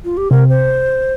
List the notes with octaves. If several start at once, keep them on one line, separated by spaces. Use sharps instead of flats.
F4
G4
C3 A#4
C5